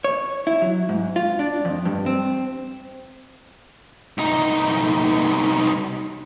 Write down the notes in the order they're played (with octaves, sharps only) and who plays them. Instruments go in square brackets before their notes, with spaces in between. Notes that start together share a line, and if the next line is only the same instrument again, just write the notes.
[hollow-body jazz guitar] C#5
E4
F#3
G#2
F4
D4
F2
G2
C4
[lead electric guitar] C2 D#4